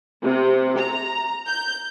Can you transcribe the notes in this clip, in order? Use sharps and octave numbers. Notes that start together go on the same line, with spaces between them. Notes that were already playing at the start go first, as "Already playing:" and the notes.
C3
A#5
G6